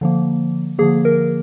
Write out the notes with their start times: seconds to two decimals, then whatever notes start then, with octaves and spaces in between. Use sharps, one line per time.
0.01 D3 F3 A#3
0.79 D3 F3 A#3 G#4
1.05 A#4